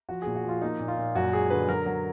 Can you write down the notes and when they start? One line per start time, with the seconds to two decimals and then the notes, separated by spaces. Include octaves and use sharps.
0.09 F3 F#4
0.22 G#4
0.26 A#2
0.35 F#4
0.44 F3 F4
0.62 A#3 D#4
0.80 A#2
0.88 F4
0.97 A#2
1.15 F#2 F#4
1.33 G#3 G#4
1.50 D3 B4
1.68 F#3 A#4
1.86 F#3